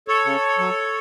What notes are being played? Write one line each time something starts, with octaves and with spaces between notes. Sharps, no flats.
A4 C#5
C#3
F#3